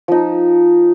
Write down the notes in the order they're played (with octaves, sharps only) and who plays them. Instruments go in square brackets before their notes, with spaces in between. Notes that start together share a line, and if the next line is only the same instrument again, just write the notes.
[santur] F3 D#4